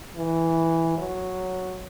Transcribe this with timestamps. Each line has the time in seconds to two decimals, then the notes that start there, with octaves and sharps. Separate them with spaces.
0.16 E3
0.98 F#3